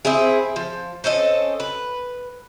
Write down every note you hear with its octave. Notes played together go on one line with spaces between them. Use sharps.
C4 E4 G#4
F3
C4 C#4 A4 D#5
B4